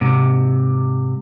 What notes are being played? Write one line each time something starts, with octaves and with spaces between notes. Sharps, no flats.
G#2 C3